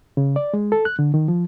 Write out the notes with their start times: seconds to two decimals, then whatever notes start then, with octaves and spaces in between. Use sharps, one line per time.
0.17 C#3
0.36 D5
0.54 G#3
0.72 A4
0.85 F#6
0.99 D3
1.14 D#3
1.28 F3